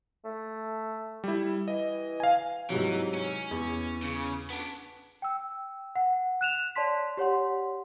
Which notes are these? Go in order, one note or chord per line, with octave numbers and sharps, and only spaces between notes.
A3
G3 E4
E3 D#5
F5 G#5
G#2 C3 E3 F#3
C#4
E2
C#3
B3 D4
G5 E6
F#5
F#6 E7 F7
C#5 D5 A5 C6 B6
G4 C#5 F#5 C6